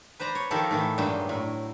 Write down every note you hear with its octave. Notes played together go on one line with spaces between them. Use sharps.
B4 C5 D5 A#5
C#5
D#3 F3 G4 A4 A#4 D5
A2 D#3 E3
G2 A#2 F#3 G#3 G5
A2